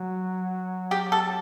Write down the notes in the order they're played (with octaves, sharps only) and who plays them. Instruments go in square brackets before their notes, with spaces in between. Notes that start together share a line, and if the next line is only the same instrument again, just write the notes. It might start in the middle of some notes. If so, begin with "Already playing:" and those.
Already playing: [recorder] F#3
[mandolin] G4
A4